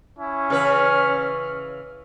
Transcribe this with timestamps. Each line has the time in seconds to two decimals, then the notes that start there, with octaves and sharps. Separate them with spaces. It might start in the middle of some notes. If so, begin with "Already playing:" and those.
0.19 C#4 E4
0.50 C#3 E3 B4 F6